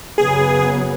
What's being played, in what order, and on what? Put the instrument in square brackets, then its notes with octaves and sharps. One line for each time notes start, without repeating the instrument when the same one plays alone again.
[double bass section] F#2 C#3 F#3 B3 [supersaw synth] G#4